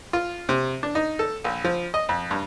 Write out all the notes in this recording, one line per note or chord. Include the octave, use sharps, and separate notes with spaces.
F4
C3
D4
D#4
A4
A#1
F3
D#5
F2
G2